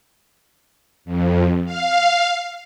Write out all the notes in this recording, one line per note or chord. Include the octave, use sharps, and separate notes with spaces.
F2
F5